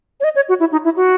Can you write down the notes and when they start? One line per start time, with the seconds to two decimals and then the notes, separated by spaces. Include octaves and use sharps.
0.20 C#5
0.24 D#5
0.36 C#5
0.49 F#4
0.60 E4
0.72 D#4
0.85 E4
0.97 F#4